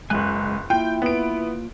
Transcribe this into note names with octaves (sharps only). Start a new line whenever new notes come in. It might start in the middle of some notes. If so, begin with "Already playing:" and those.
F#1 C#2 G#3 G#5 F#6
A#3 E4 F4 G5
B3 D7